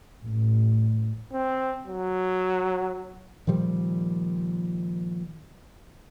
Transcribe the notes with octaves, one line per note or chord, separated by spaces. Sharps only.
A1
C4
F#3
A#2 D#3 F3 G3